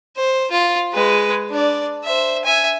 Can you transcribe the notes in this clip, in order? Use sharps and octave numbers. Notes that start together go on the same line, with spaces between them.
C5
F4
G#3 B4
D4 D5
C5 E5
E5 G#5